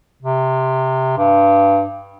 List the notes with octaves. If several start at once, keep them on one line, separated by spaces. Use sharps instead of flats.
C3
G2